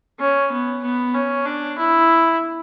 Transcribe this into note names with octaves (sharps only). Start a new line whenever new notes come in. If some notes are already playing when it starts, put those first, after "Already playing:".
C#4
B3
B3
C#4
D4
E4